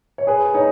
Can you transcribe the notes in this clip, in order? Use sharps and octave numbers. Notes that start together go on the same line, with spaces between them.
C#5
G#4 B4
D#4 C#5